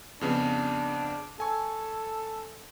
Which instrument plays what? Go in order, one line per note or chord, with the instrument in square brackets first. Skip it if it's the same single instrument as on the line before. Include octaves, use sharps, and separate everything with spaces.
[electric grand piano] F2 C#3 B3 [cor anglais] D4
[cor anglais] A4 [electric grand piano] G#5 C#6